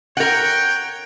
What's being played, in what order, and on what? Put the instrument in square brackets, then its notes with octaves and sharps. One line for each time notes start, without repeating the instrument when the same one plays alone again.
[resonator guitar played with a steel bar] A#4 F#5 [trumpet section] C#5 G5